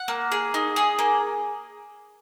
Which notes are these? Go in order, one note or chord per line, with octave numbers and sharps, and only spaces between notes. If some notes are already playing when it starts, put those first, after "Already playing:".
Already playing: F#5
A#3
G#4
D#4
G#4
A#3